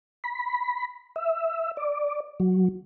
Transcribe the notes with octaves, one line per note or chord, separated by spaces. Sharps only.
B5
E5
D5
F#3